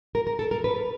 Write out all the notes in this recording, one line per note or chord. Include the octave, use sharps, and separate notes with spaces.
A#4
A#4
A4
A#4
B4